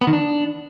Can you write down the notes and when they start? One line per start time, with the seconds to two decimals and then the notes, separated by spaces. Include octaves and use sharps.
0.01 B3
0.07 D#3
0.13 D4